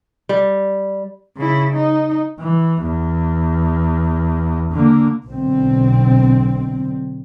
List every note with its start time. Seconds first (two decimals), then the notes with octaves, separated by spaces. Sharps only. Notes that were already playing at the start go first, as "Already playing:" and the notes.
0.29 G3
1.37 C#3 E4
1.73 D#4
2.40 E3
2.83 E2
4.72 D3 A#3
5.27 B1 B2 D3 C4